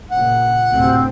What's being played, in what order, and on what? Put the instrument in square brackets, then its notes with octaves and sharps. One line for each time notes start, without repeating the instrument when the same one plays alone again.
[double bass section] A#2 C#3 [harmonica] F#5
[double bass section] D2 A2 C3 [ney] C4